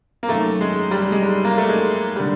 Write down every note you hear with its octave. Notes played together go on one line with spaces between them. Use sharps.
A#3
F#2 D#3 A3
G#3
G3
G#3
G3
A#3
A3
G#3
D3 G3